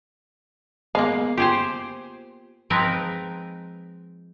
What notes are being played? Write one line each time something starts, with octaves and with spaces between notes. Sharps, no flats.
G#3 A#3 B3 F5
F4 G4 G#4 C5 G#5
F3 G#3 C4 D#4 A#4 B4